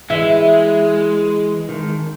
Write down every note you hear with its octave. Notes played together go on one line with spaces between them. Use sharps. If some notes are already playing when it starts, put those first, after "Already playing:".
E3 G#3 E5
D#3 G#3